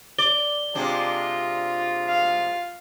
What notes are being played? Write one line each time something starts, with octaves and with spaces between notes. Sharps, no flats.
D5 G7
C3 G#3 D4 F4
F5